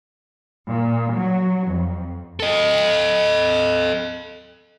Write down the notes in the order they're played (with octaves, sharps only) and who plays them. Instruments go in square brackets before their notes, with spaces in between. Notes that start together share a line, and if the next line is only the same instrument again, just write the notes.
[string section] A#2
F#3
F2
[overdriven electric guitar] A4 D#5